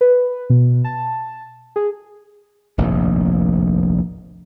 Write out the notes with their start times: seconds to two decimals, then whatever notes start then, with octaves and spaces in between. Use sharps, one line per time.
0.01 B4
0.50 B2
0.84 A5
1.76 G#4
2.78 F1 A#1 D#2 A2